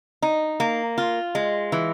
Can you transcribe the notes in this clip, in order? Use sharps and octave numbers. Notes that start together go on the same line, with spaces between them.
D#4
A#3
F4
G#3
E3